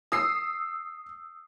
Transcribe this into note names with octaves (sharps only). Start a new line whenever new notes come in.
D#6 E6 C7